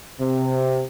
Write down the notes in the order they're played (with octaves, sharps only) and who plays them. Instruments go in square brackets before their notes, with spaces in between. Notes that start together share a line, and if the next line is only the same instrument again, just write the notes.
[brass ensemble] C3